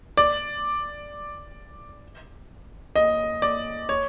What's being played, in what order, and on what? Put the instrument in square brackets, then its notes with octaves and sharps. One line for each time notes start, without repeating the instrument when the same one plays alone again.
[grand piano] D5
D#5
D5
C#5